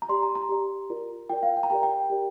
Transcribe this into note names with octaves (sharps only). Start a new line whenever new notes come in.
A#5
G4 D5 C6
A#5
A#5
G4 D5
F4 A#4 D5
F4 A#4 D5 G5
F5
G5
A#5
G4 A#4 D5 G5
G5
G4 A#4 D5